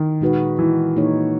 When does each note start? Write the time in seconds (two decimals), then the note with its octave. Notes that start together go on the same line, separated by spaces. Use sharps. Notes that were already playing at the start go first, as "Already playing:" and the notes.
Already playing: D#3
0.21 A#2 G#3 D#4 F#4 B4
0.59 E3
0.96 A#2 A#3 D#4 G#4 C#5